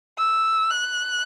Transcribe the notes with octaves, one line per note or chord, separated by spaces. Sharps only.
E6
F#6